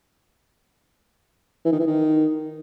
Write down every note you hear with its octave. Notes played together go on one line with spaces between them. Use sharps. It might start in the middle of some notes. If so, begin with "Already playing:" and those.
E3
D#3
E3
D#3